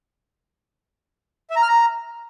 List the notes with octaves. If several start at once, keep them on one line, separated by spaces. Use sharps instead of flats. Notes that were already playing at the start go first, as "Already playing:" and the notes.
E5
A#5
F6
A#5